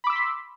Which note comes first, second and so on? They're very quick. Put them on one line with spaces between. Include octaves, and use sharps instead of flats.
B5 D6 E6 B6 C6